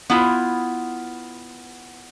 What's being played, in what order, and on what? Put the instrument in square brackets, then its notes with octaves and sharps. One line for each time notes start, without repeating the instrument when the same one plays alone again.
[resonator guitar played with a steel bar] B3 E4 F4